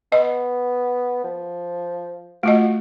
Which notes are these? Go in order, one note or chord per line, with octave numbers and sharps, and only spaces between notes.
B3 D#5
F3
A3 F4 F#4 D#5